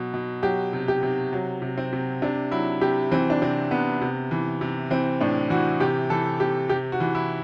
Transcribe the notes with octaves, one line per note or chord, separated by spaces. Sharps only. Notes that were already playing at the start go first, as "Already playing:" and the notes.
Already playing: B2 F#3
B2
F#3 G4
C3
G4
C3
F#3
C3
C4
C3
C3 D4
F#3 E4
C3 G4
E3 C4
D4
C3 C4
C3 B3
C3
E3
C3
E3 C4
A2 D4
E3 F#4
C3 G4
E3 A4
C3 G4
C3 G4
F#4
E3
E4